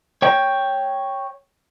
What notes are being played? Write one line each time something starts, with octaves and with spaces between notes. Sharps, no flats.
C#5 G5